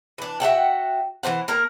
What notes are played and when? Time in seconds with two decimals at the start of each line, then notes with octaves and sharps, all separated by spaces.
0.18 E3 D4
0.40 F#4 E5 F#5 G5
1.23 E3 F#3 C5 F#5
1.48 A#3 A#4 A#5